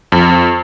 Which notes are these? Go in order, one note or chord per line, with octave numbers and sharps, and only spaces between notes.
F2